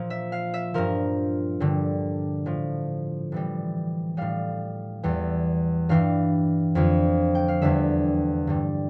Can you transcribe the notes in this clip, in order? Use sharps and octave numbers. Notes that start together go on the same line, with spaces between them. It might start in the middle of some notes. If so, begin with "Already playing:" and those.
Already playing: A#2 F3
E5
F5
E5
G2 F3 A#4
G2 D3 G3
A2 F3
A2 E3 G3
A2 G3 F5
E2 E3 G3
G2 E3 G3 F5
F2 D3 F3
G5
F5
E2 D3 G3 E5
G2 D3 G3